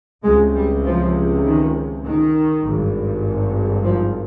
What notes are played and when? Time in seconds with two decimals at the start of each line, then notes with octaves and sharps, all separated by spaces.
0.23 C#2 C3 G#3
0.54 G3
0.84 F3
1.44 D#3
2.04 D#3
2.64 G#1 G2
3.84 F3